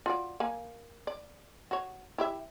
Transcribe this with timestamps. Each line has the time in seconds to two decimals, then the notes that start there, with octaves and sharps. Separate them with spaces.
0.06 F4 F#4 D5
0.40 A#3 G#5
1.07 D5
1.71 F#4 C#5
2.18 E4 G4 E5